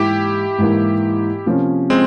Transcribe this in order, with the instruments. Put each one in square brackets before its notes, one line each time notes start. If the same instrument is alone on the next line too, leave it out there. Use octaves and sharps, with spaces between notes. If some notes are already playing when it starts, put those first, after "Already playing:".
Already playing: [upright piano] G#2 E3 A#3 [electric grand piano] E4 G4
[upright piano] G#2 E3 A#3
C3 F3 A#3 C#4
[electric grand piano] G#3 C4